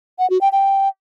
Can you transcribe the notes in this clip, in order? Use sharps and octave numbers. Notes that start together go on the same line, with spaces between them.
F#5
F#4
G5
G5